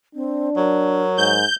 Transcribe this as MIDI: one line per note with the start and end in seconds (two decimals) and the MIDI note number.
0.15 0.50 60
0.15 1.03 62
0.57 1.38 54
0.57 1.41 70
1.18 1.44 44
1.18 1.56 91